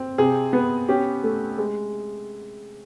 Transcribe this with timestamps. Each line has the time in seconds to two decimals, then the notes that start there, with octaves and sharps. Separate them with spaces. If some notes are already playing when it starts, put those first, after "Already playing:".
Already playing: C4
0.18 C3 G#4
0.53 B3
0.88 C#4 G4
1.24 A3
1.58 G#3